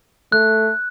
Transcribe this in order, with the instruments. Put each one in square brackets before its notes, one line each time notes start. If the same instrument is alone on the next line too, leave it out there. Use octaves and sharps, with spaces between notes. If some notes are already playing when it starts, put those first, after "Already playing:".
[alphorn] A3 [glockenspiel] F#6